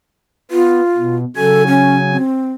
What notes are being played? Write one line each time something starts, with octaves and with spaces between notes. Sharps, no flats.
B3 F4
B2
C#3 F#3 A4 G#5
C#4
C4